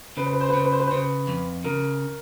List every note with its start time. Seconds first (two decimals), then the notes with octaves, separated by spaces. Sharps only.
0.17 C#3 B4
0.26 C5
0.33 B4
0.40 C5
0.49 B4
0.53 C#3 C5
0.64 B4
0.72 C5
0.80 B4
0.87 C5
0.91 C#3 B4
1.27 F2
1.64 C#3 A#4